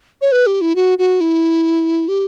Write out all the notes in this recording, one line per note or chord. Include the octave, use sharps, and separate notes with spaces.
C#5
B4
G4
E4
F#4
F#4
E4
G4